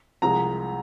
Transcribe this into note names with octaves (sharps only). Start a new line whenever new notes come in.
C2 C3 F3 G#3 A#5